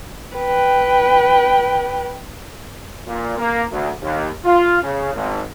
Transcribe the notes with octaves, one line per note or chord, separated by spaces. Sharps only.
B4 G5
A#2
A#3
D2
D#2
F4
C#3
G#1